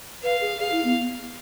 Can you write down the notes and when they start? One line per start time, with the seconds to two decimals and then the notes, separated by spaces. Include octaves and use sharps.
0.23 B4 F5
0.41 G#4
0.59 G#4 F5
0.72 E4
0.84 B3